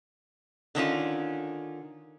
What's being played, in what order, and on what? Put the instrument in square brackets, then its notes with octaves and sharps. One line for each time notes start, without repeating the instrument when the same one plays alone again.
[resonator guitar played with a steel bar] D3 D#3 C#4 F4